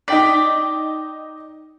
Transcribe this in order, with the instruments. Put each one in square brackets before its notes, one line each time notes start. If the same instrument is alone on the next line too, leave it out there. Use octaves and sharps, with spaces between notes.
[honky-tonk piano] D#4 G5 B6 [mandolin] D5